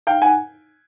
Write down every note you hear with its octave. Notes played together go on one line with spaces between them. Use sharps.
F5 G5
F#5 G#5